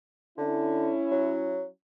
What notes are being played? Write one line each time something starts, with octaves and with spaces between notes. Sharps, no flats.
D3 C#4 E4
F#3